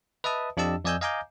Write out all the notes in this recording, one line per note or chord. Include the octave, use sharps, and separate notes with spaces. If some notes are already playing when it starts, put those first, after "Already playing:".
B4 D#5 E5 A5 D#6
F2 D4 G4 D#5 A5 E6
F2 D5 D#5 G#5 E6 G6
D#5 F5 G#5 A#5 D6 G6